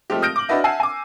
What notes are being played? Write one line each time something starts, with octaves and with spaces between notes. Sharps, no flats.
F3 G#3 A3 C4 G4
D#6 F6 G6 A#6 D7
D6 F#7
D4 E4 F#4 B4 D#5 E5
E5 F#5 G#5 A5 E6 C7
G#5 D6